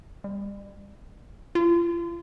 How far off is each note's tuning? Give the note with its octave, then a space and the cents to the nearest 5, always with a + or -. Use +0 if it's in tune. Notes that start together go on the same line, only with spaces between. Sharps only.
G3 +40
F4 -35